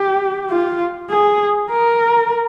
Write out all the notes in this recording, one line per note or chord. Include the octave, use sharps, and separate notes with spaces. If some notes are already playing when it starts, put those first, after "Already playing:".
Already playing: G4
F4
G#4
A#4